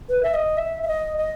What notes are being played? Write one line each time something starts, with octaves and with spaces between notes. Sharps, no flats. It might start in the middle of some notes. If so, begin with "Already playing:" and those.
B4
E5
D#5
E5
E5
D#5
D#5